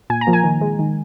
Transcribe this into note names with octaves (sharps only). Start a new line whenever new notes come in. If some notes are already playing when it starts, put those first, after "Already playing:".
A#2 G#5
A#5
F3 A#3
G#5
D#3
G#3
D#3